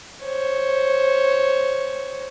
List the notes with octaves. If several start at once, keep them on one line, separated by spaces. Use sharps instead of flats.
C5 C#5